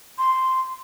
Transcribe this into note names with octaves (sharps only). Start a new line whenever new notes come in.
C6